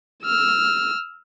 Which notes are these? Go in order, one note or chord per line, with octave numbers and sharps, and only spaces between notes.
E6 F6